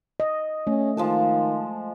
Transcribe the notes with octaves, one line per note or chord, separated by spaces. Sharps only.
D#5
A3 C#4
D#3 F3 G#3 A5